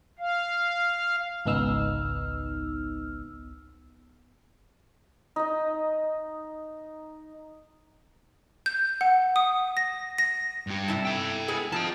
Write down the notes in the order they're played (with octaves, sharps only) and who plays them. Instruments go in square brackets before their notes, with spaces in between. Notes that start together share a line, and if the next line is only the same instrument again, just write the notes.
[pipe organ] F5
[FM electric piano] G#1 C#2 B3 D#4 E6 F6
[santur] D#4 D#5
[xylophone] G6
F#5
D#6
A#6
A#6
[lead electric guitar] G2 G4
[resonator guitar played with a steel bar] C3 E4 A5
[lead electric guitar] A4 G5
[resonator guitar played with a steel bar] G#3 B3 G#4
[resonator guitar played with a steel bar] F3 C4 [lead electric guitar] D#5 A5